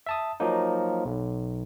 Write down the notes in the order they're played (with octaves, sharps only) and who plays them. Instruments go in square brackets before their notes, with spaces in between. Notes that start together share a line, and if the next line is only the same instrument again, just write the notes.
[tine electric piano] E5 A5 D#6
F3 F#3 A#3 D#4
B1